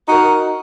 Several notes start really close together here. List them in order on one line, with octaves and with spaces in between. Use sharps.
D#4 F#4 A#4